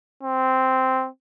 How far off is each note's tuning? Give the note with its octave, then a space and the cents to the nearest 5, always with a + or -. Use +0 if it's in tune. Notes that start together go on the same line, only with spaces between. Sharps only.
C4 -5